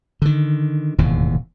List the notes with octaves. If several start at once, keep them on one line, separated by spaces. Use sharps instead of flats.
D3 D#3
E1 D#2 A2 C3